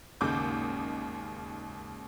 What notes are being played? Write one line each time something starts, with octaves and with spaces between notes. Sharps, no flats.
G#1 D#2 C#3 G#3 D6 G6